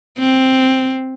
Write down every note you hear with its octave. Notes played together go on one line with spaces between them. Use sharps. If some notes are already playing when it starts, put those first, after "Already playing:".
C4